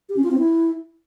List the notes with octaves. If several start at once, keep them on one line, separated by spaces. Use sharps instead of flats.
G4
C#4
F4
C4
E4